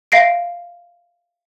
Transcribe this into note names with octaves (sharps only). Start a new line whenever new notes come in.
E5 F5 A#6 C7 D7